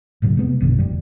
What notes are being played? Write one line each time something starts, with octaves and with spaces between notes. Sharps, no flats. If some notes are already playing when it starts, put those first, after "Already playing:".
E1 A2 C#3 F#3
C3 G#3 A3 B3
A#1 F#2 B2 D3
F1 G3